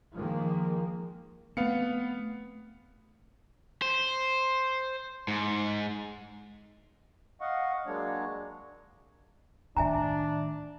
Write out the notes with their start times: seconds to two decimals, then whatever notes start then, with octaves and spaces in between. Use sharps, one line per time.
0.15 D#3 F3 G#3 A#3
1.57 A3 B3 C4 F5 C#7
3.82 C5
5.28 G#2
7.41 D#5 F5 F#5 C#6
7.86 F#3 G#3 A#3 D4 C#5
9.77 A2 D#3 D4 E5 G#5 A#5